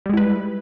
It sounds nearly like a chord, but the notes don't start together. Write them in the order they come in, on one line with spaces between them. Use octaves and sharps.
G3 G#3 E4 B4